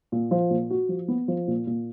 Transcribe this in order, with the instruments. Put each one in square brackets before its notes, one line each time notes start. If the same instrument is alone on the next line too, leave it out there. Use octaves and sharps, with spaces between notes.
[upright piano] A#2
F3
A#2
F#4
F3
B3
F3
A#2
A#2